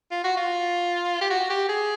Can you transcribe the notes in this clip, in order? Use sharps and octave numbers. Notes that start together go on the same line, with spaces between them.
F4
F#4
F4
G4
F#4
G4
G#4